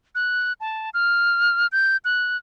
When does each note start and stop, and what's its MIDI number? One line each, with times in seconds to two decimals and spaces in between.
0.15 0.53 90
0.60 0.90 81
0.94 1.67 89
1.72 1.97 91
2.05 2.37 90